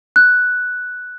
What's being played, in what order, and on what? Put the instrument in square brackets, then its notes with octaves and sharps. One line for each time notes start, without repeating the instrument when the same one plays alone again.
[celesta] F#6